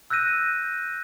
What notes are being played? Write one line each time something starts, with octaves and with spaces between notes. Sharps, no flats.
E6 F#6 G6 A#6 D#7